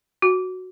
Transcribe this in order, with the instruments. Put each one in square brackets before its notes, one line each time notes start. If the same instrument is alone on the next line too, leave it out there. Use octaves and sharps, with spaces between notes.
[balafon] F#4